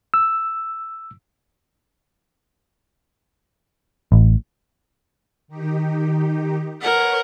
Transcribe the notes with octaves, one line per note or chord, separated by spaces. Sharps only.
E6
A1
D#3 D#4 G4
A#4 B4 C#5 F#5